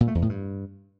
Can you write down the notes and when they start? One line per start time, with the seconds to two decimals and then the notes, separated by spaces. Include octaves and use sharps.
0.01 A#2
0.08 A3
0.15 E2
0.22 A2
0.29 G2